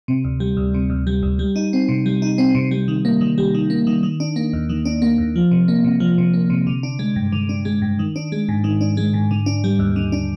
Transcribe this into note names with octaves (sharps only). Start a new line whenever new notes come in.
C3
D2
G3
D2
C3
D2
G3
D2
G3
D#4
C4
C3
G3
D#4
C4
C3
G3
D#3
A#3
D#3
G3
D#3
A#3
D#3
D#3
D4
A#3
D#2
D#3
D4
A#3
D#2
F3
C3
A#3
C3
F3
C3
A#3
C3
D3
D4
G#3
G2
D3
D4
G#3
G2
D#3
D4
G#3
G#2
D#3
D4
G#3
G#2
D3
D4
G3
D#2
D3
D4